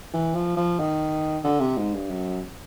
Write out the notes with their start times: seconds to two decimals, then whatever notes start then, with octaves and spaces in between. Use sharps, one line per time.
0.14 E3
0.35 F3
0.56 F3
0.79 D#3
1.44 D3
1.60 C3
1.77 G#2
1.94 G2
2.10 F#2